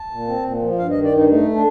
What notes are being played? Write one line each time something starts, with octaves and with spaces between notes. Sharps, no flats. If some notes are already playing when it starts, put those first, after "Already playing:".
Already playing: A5
A#2
C4
A#2
F3
G2 F5
D#5
D#3
D5
G2 D#4
A3 D#4
D4